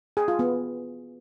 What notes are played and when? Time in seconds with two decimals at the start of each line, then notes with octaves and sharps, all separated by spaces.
0.17 G#4
0.28 F4
0.39 B3